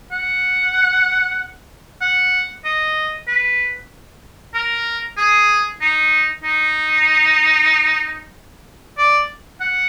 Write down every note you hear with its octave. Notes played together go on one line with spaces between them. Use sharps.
F#5
F#5
D#5
B4
A#4
G#4
D#4
D#4
D5
F#5